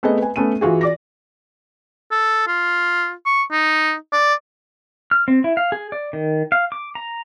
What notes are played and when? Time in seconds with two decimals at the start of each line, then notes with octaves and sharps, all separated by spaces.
0.03 A3 B3 C4 G#4 C5 D#5
0.18 B4 G#5
0.36 A3 B3 C#4 D#7
0.61 E3 F4 F#4 G#4
0.81 D5 D6 A#6
2.11 A4
2.47 F4
3.25 C#6
3.51 D#4
4.12 D5
5.11 F6
5.28 C4
5.44 E4
5.57 F5
5.72 G#4
5.92 D5
6.13 D#3
6.52 F5
6.72 D6
6.95 A#5